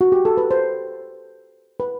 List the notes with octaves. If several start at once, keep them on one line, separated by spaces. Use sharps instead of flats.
F#4
G4
A4
B4
C5
B4